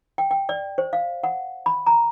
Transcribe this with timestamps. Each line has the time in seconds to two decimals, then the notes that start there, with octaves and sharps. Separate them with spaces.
0.18 G5
0.31 G5
0.49 D5
0.78 C5
0.93 F5
1.24 F#5
1.66 B5
1.86 A#5